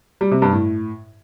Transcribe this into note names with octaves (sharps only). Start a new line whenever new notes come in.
G3
C3
G2
A2